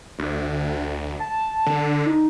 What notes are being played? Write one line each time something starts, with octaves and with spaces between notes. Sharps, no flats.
D2
A5
D3
D#4